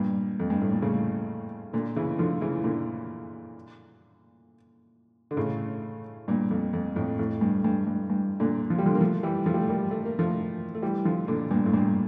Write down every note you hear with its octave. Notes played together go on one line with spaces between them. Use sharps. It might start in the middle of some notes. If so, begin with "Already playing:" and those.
Already playing: G2 A#2
F2
G2
A2
A#2
A2 C#3
A#2 D3
C#3 E3
D3 F3
C#3 E3
A#2 D3
D3
A2 C#3
G2 A#2
F2
F2
F2 A2
F2 A2
G2
G2
G2
G2
A#2 D3
F3
G3
D3 F3
A#3
F3 A3
E3 G3
F3 A3
G3
A3
G3 A#3
A3
A#3
F3 A3
A3
E3 G3
D3 F3
A#2 D3
G2 A#2
A2
G2 A#2